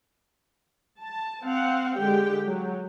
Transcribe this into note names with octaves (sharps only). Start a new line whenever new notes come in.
A5
C4 F5 F#5
D3 G#3 G4 G5
F#3